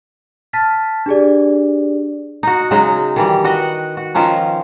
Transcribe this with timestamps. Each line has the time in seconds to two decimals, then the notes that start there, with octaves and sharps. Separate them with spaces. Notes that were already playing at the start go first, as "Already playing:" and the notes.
0.53 A5 F6 A6 B6
1.06 D4 G4 G#4 D5
2.43 D#4 F#4
2.71 C#3 F#3 G#3 D#4
3.16 D#3 E3 G3
3.44 F#4 B4 D#5 F#5
3.97 F#4
4.14 D#3 F3 C#4 D#4